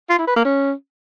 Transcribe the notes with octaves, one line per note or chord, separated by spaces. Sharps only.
F4
E4
B4
A#3
C#4